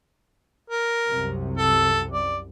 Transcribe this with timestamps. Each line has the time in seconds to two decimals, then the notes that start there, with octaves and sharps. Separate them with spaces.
0.70 A#4
1.08 C2 F#2 C3
1.58 A4
2.13 D5